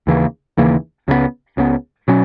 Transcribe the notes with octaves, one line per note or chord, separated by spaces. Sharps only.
D#2 C#3 E3 A#3
D#2 C#3 E3 A#3
C#2 C#3 F#3 B3
C#2 C#3 F#3 B3
B2 F#3 C#4